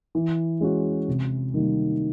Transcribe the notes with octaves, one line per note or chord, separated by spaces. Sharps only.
E3
G#3 C#4 F#4
C3
D#3 G3 A#3